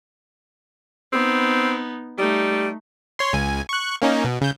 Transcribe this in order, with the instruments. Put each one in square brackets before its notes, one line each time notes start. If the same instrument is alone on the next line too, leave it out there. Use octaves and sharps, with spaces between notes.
[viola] B3 D#4 [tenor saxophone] C4
[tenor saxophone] G3 [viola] A3 D#4
[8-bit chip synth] C#5 C6
C#2 G#5
C#6 F#6
A#3 C#4 D#4
B2
C#3 G6